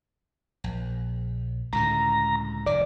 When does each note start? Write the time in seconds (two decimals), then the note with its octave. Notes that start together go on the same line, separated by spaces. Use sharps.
0.64 A#1
1.73 C#2 A2 D3 A#5
2.66 F1 D#3 D5